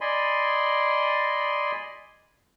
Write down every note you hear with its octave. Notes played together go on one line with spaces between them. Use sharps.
D5 D#5 G#5 B5 C6